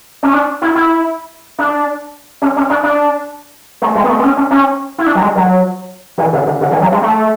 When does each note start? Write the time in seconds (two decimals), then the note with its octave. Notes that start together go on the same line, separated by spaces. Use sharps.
0.23 C#4
0.34 D4
0.62 E4
0.75 E4
1.58 D4
2.42 C#4
2.56 C#4
2.70 D4
2.83 D4
3.82 A3
3.95 G#3
4.04 B3
4.10 A3
4.19 B3
4.24 C#4
4.37 C#4
4.51 C#4
4.98 E4
5.06 D4
5.15 F#3
5.21 G#3
5.35 F#3
6.18 E3
6.33 D3
6.46 D3
6.61 D3
6.71 E3
6.81 F#3
6.92 G#3
7.02 A3